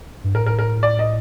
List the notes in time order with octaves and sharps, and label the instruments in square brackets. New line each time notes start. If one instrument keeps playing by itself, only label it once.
[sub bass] G2
[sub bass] A2 [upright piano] A#4
[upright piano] A#4
A#4
D5
D#5